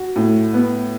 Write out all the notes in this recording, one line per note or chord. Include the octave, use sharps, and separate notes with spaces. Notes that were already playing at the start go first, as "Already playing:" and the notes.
Already playing: F#4
A2
B3